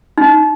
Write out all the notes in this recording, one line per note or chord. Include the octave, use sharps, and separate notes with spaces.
D#4